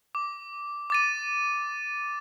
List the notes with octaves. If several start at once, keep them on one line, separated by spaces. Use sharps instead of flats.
D6
D6 A6 D#7